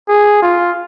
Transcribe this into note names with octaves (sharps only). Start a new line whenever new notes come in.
G#4
F4